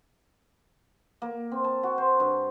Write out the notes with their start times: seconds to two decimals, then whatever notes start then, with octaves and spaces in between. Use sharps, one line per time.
1.22 A#3
1.51 C4
1.64 A5
1.83 F#4
1.98 C5
2.20 G2